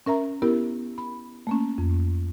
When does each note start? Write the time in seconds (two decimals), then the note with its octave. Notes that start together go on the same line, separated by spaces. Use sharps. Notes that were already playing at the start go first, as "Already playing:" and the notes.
0.06 C#4 A#4 E5 A#5
0.42 B3 E4 G4 A#4
0.98 B5
1.47 A3 A#3 C#4
1.78 F2